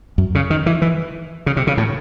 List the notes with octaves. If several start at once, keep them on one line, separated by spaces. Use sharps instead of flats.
F#2
C#3
D#3
E3
E3
C#3
C3
C#3
A2